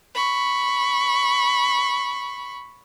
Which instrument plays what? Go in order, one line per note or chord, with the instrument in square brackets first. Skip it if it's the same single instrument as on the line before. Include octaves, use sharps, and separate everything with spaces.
[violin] B5 C#6